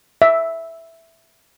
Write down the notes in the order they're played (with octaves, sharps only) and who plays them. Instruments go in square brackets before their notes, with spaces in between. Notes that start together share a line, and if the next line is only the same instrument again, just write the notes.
[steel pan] E5